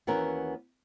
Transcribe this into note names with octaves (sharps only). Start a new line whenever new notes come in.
D#2 E3 B3 C#4 F#4 A#4